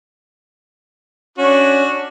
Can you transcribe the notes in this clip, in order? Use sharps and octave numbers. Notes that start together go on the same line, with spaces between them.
C#4 D4 F#4